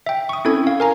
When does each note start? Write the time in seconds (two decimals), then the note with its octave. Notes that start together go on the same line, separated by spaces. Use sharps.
0.06 E5 G5
0.29 C#6 D#6
0.45 C4 C#4 E4 A4 G#6
0.67 F5
0.80 A#4 G#5 A#5